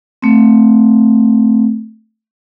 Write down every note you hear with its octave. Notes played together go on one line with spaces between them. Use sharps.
A3 C4